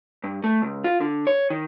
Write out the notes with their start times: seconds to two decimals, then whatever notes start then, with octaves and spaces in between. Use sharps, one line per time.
0.24 G2
0.44 A3
0.62 C#2
0.84 F4
1.01 D3
1.27 C#5
1.50 D#3